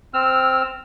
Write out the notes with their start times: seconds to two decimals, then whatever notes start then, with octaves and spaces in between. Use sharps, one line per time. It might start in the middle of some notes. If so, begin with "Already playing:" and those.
0.14 C4 E6 F6